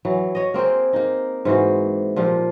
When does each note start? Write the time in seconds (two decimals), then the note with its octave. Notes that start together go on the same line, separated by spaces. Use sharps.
0.05 E3 F#3
0.35 C#5 D#5
0.54 A#3 C4 G#4 C5
0.93 A#3 D#4
1.45 G#2 E3 F#4 C5
2.16 A#2 F3 G4